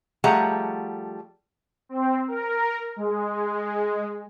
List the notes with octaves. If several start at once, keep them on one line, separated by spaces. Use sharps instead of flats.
F3 G3 A3 G#4 F#5 A#5
C4
A#4
G#3